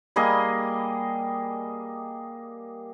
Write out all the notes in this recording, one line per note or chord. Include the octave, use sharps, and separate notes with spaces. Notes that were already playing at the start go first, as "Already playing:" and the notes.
G3 A#3 G#4 D#5